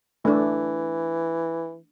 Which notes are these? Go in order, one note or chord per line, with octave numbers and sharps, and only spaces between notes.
E3 A3 D4